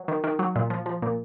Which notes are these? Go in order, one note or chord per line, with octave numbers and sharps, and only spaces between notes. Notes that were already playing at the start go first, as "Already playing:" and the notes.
Already playing: F#3
D#3
D#3
F#3
A#2
F3
F3
A#2